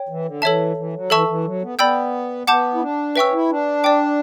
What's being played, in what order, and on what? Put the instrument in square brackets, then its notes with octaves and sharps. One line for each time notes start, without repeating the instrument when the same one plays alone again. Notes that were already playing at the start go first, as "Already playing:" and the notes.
Already playing: [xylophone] C#5 G5
[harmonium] E3
D3
[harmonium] E3 [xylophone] A4 C#5 E5 A5
[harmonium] E3
F#3
[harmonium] E3 [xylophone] A4 E5 A5 C#6 E6
[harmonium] E3
F#3
B3
[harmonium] B3 [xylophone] D5 G5 B5 E6 G6
[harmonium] B3 [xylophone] F#5 A5 D6 G6
[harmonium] E4
D4
[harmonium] C#4 [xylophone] B4 E5 G5 C#6 E6
[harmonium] E4
D4
[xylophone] D5 G5 D6